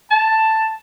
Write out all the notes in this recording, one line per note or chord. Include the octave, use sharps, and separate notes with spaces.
A5